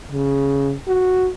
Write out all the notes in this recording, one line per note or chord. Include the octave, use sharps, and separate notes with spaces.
C#3
F#4